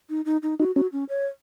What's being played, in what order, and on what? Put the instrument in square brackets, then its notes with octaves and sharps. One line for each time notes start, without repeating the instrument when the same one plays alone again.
[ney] D#4
D#4
D#4
[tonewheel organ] D#4 [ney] F#4
[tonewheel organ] C#4 [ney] F#4
[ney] C#4
C#5